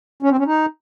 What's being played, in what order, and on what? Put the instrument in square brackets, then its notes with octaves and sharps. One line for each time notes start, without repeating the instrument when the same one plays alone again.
[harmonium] C#4
C4
C#4
D#4